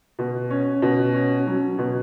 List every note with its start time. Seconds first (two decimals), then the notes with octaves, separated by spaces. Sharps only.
0.19 B2
0.50 C#4
0.82 B2
1.14 C#4
1.47 F#3
1.78 B2